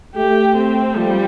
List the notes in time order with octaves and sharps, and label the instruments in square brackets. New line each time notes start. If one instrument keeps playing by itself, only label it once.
[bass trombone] A3 [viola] G4
[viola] C4
[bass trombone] F3 [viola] G3